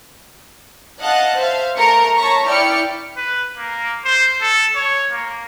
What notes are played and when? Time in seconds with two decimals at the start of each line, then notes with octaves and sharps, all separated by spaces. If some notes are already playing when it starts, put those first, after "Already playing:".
1.01 D#5 F5 F#5 A5 F#6
1.38 C5 E5 F5
1.76 A3 A#4 C#7
2.17 C#5 A5 A#5 C#6 B6
2.47 E4 D5 G5 F6 C#7
3.16 B4
3.58 A#3
4.05 C5
4.42 A4
4.76 C#5
5.11 A#3